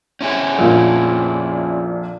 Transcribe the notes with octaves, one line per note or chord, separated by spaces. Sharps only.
C#4 E4 G#4
A#1 F2 A#2